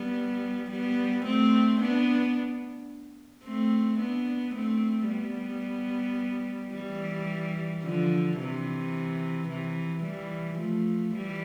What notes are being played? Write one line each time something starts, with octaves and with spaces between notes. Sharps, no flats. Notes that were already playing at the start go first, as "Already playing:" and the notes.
Already playing: G3 B3
G3 B3
A3 C4
B3 D4
A3 C4
B3 D4
A3 C4
G3 B3
E3 G3
D3 F3
C3 E3
C3 E3
E3 G3
F3 A3
E3 G3